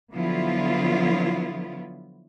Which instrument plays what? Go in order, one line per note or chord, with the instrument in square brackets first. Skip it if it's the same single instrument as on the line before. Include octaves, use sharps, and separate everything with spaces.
[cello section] D3 F3 F#3 B3 E4 F4